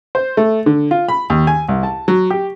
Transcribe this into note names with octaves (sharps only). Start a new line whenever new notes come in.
C5
A3
D3
F4
B5
D#2
G#5
C2
A5
F#3
G4